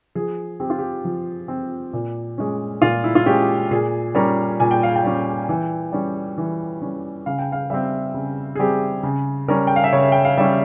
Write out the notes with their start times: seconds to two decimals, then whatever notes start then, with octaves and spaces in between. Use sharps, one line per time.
0.15 F3 G#4
0.60 C4 G4
0.70 F4
0.79 G4
1.05 F3
1.48 C4
1.93 A#2
2.38 G#3 C#4
2.82 A#2 F4
3.04 E4
3.15 F4
3.26 G#3 C#4 G4
3.71 A#2 G#4
4.15 G3 C#4 A#4
4.60 A#2 G#5
4.71 G5
4.83 F5
4.96 G5
5.04 G3 C#4
5.49 E3
5.92 G3 C#4
6.38 E3
6.82 G3 C#4
7.26 C#3 F5
7.39 G5
7.52 F5
7.70 G3 C4 E5
8.14 C#3
8.55 G#4
8.59 G3 C4 G4
9.03 C#3
9.48 G3 C#4 A#4
9.67 G5
9.76 F5
9.84 E5
9.93 C#3 C#5
10.12 G5
10.25 F5
10.38 G3 C#4 E5